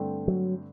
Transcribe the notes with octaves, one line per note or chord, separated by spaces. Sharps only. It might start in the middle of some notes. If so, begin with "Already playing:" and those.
Already playing: G2 D3 A3 C4
F#3